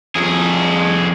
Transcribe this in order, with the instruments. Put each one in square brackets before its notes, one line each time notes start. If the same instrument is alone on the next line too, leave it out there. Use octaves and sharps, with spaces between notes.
[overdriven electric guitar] F2 G#4